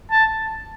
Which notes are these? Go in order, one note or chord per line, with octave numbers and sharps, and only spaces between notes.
A5